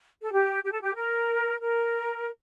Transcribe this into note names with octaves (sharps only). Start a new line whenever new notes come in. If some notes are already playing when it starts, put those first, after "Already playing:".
A4
G4
G4
A4
G4
A#4
A#4